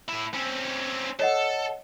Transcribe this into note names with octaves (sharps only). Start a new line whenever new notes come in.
A2 E4
C4 C#4
A4 C#5 D#5 F#5